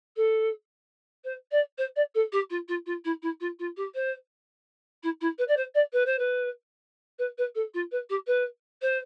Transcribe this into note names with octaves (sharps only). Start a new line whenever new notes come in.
A4
C5
D5
C5
D5
A4
G4
F4
F4
F4
E4
E4
F4
F4
G4
C5
E4
E4
B4
D5
C5
D5
B4
C5
B4
B4
B4
A4
F4
B4
G4
B4
C5